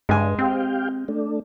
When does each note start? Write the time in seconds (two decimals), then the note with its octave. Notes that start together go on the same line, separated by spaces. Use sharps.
0.09 G2 G#3 G#5
0.39 C4 G4 F5 G5
1.08 A3 D4